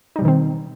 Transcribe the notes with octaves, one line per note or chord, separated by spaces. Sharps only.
B2 D#3 G3 C4 D#4